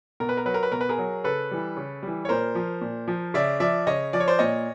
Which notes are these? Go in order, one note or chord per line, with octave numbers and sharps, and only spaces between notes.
B2 A#4
B4
A#4
F#3 B4
A#4
B4
B2 A#4
B4
G#4 A#4
F#3
C#3 A4 B4
E3 G3
C#3
E3 G3
C#5
A#2 A#4 C5
F3
A#2
F3
C#3 D5 E5
F3 D5 E5
C#3 C#5 D#5
F3 D5
C#5
C5 D5
A#2 C#5 D#5